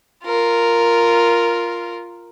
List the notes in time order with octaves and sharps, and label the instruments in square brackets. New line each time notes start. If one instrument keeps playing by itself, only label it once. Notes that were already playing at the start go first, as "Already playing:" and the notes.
[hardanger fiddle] F4 A#4